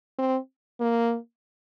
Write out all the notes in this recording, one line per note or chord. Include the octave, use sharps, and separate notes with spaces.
C4
A#3